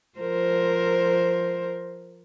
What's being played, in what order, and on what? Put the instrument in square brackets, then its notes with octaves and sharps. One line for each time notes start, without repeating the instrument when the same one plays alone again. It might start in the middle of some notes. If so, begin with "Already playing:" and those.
[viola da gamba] F3 A#4 C5